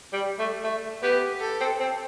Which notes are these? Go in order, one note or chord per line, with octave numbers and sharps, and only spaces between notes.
G3
A3
A3
B3 G4
A4
C4
C4